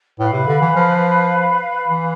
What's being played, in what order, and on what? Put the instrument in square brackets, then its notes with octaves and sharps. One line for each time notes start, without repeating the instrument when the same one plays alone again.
[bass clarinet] A2 [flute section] B4 F5 B5
[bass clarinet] C3
D3
E3
F3
E3